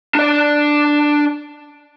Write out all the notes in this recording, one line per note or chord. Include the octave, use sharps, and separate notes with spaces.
D4 D5